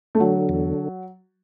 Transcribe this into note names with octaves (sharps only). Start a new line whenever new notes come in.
A3
D3 F#3
E2